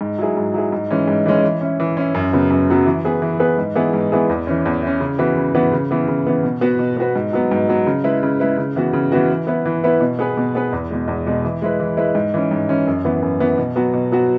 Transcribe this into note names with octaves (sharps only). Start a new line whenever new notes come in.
G#2
F#3 E4 G#4
G#2
F#3 E4 G#4
G#2
E3 G#3 C#4
G#2
E3 G#3 C#4
E3
C#4 E4
E3
C#4 E4
F#2
C#3 F#3 B3
F#2
C#3 F#3 B3
E3
B3 G#4 B4
E3
B3 G#4 B4
G#2
E3 B3 E4 G#4
G#2
E3 B3 E4 G#4
E2
E3 C#4
E2
E3 C#4
C#3
E3 B3 F#4 B4
C#3
E3 B3 F#4 B4
C#3
E3 B3
C#3
E3 B3
B2
B3 F#4 B4
B2
B3 F#4 B4
G#2
F#3 B3
G#2
F#3 B3
C#3
G#3 E4 B4
C#3
G#3 E4 B4
C#3
E3 B3 F#4
C#3
E3 B3 F#4
E3
B3 E4 B4
E3
B3 E4 B4
B2
B3 G#4 B4
B2
B3 G#4 B4
E2
B2 G#3
E2
B2 G#3
E3
G#3 E4 B4
E3
G#3 E4 B4
G#2
E3 C#4
G#2
E3 C#4
F#2
E3 B3
F#2
E3 B3
B2
F#3 B3 F#4
B2
F#3 B3 F#4